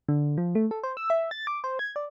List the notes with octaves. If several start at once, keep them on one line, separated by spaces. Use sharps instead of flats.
D3
F3
A3
A4
C5
E6
E5
A6
D6
C5
G#6
D5